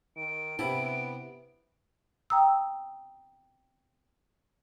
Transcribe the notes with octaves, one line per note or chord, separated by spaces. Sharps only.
D#3 D7
C3 B3 E4 A5
G5 A#5 D#6 E6